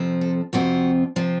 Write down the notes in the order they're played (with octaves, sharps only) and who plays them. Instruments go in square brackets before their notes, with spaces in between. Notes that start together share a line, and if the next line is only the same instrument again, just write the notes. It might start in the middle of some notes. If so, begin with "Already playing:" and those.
Already playing: [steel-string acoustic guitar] F2 C3 F3 C4
A4
F2 C3 F3 C4 F#4
C3 F3 C4